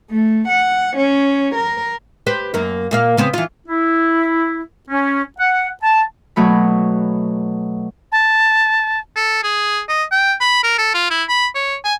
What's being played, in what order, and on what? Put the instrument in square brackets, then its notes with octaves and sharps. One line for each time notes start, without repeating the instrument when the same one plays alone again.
[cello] A3
F#5
C#4
A#4
[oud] G4 B4 C5
F#2 A#3
A#2 A#3 F5
C#3 B3 C4
E3 F4
[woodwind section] E4
C#4
F#5
A5
[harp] B2 F#3 A3 B5
[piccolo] A5
[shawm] A4
G#4
D#5
G5
B5
A#4
A4
F4
E4
B5
C#5
G#5